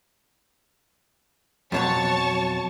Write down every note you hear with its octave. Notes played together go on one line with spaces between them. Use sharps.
F2 B2 F#3 C#5 A5 C#6